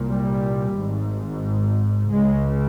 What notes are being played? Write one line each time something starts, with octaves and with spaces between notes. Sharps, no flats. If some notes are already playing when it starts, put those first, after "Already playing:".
Already playing: C2 A#2
G3
G#1 G#2
C#2 C#3 G#3